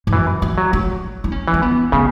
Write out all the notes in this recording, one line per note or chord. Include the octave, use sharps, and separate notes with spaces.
G#2
F#2 E3
E3
F#3
F#3
E4
C#4
E3
C#4
B3
C#3 B3